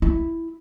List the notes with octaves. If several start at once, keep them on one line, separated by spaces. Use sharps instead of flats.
E4